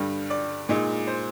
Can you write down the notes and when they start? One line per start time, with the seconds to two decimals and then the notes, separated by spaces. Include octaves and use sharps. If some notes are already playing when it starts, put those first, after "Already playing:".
Already playing: G2 D3 G3
0.30 D5
0.69 A#2 G#3 D#4
1.07 C5